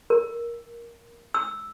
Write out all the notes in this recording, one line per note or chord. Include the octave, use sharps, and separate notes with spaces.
A#4
E6